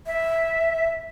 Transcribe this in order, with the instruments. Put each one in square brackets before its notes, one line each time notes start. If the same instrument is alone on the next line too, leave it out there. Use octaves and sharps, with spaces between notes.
[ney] E5